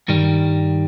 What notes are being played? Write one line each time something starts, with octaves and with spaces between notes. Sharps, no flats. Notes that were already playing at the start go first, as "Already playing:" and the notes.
G2 D#3 G3